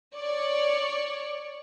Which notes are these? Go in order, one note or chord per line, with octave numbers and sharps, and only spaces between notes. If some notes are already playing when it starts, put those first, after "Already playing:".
C#5 D5 C#6